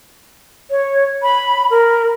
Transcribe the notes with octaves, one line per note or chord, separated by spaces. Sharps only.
C#5
B5
A#4